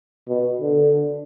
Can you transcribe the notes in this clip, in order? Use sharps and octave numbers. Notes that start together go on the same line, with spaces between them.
B2
D3